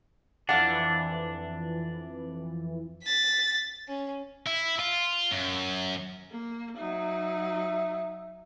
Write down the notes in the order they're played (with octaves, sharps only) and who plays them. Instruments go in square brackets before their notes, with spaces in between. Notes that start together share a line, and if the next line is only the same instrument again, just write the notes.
[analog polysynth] F2 E3 [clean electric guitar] D4 [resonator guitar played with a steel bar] F5 F#5
[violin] A6 B6
C#4
[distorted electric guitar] E4
F4
F#2
[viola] A#3
[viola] F#3 D#4 [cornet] E5